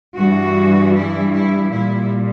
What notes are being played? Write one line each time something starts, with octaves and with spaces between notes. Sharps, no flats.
G2 E3 G3 F#4
E4
E4
A#2 G3 E4